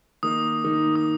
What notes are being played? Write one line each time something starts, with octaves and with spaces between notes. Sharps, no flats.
D#3 A#3 D#4 D#6
D#3 A#3 D#4
D#6